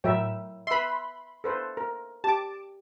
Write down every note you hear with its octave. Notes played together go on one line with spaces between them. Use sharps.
A2 F#3 A#4 E5 G5
B4 E5 B5 C6
A4 B4 C5
A#4
G4 A5 D6